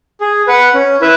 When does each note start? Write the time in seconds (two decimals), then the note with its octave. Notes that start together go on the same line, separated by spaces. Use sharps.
0.20 G#4
0.47 B4 F#5
0.74 C#4
1.01 E4 B4 E5